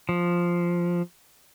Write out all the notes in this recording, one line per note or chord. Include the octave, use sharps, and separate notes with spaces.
F3